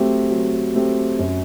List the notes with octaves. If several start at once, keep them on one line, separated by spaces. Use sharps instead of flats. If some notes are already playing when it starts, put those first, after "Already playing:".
Already playing: F#3 A3 C4 G4
F#3
A3 C4 G4
F#2